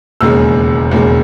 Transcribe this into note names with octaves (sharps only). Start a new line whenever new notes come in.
E1 D#2 C#3 G#3 E6
E1 D#2 C#3 G#3